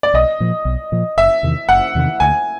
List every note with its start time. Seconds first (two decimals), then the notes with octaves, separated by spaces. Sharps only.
0.03 D5
0.14 B1 D#5
0.40 A#2 F3
0.65 B1
0.92 A#2 F3
1.17 F#1 E5
1.43 E2 C3 D#3
1.69 F#1 F#5
1.95 E2 C3 D#3
2.20 D2 G#5